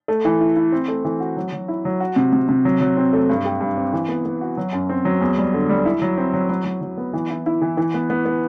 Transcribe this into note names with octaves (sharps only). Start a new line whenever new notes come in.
A3
E3
E4
E4
C4
A3
E3
F#4
F#3
F#3
E4
F#3
F#4
C3
C3
C3
F#3
F#3
C4
A3
G2
G4
G2
C4
E3
B3
B3
F#4
F#3
F#2
C4
F#3
E2
G3
D3
G3
E4
F#3
C4
F#3
F#3
F#3
F#3
B3
E3
E4
E4
E3
E3
B3
B3
B3